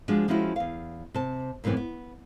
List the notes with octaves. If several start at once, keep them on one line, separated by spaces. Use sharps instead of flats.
F3 G#3 D4 F#4
F3 G#3 C#4 E4 F#4
E2 F5
C3 A5
F#2 A2 C3 E3 B3
B3